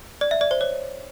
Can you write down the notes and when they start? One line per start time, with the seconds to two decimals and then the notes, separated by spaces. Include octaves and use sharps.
0.21 D5
0.31 E5
0.41 D5
0.51 C5
0.61 C#5